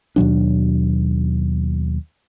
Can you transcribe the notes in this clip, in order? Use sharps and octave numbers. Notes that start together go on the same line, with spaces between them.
D#2 B2 F#3 D4